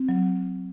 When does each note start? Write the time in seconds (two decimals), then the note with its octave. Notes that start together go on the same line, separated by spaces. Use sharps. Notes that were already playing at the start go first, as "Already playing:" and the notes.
Already playing: C4
0.09 F#3